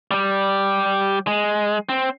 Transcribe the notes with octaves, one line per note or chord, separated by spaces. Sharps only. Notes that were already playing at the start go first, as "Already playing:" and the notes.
G3 G4
G#3
C4